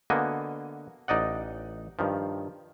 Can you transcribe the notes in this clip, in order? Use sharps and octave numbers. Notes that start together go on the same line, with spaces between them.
D3 A#3 B3 F#4 D#5 G#5
A1 D#4 D5 D#5 F#5
G2 D#3 F3